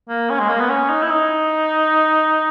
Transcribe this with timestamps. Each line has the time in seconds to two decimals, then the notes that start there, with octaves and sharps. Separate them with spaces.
0.09 A#3
0.30 C#4
0.40 G#3
0.50 A#3
0.59 B3
0.70 C#4
0.90 D#4
1.02 E4
1.10 D#4